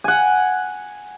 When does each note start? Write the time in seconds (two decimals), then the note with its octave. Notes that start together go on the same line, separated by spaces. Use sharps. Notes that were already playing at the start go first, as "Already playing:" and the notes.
0.04 F#5 G#5